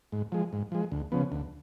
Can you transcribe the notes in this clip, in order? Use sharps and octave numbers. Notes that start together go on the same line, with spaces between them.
G#2
F3 G#3
G#2
F3 G#3
D2
C#3 F3 B3
D2